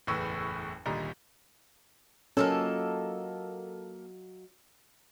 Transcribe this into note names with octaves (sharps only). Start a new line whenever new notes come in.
F#1 E2 A2 B4 C#6 E6
G#1 D2 A#2 G3 D#5 A#5
F#3 A#3 C#4 F4 A4 D#5